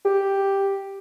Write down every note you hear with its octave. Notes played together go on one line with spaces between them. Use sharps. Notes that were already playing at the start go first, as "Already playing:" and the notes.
G4